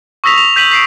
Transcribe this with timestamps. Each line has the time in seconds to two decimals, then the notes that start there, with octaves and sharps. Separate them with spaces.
0.24 C#6 D#6 E6 A#6 B6 F7
0.38 F7
0.56 G6 B6 D#7 F#7
0.71 B6 C7 D7